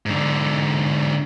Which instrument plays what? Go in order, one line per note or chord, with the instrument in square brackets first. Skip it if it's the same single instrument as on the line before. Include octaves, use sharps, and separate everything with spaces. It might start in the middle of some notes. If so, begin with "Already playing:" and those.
[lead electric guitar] G#2 D3